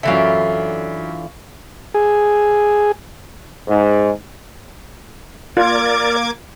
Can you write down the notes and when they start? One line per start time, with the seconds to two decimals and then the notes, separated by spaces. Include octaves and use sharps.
0.03 F#2 D3 E3 F4 E5
1.94 G#4
3.68 G#2
5.57 A#3 F4 A#4 D5 D6 G#6